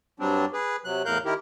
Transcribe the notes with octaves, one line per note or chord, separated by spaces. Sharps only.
G2 F#3 G3 C4 D4
G#4 B4
C3 F#3 F#6
E2 A2 A#4 F5 F#6 G6
D#3 E4 G4 A#4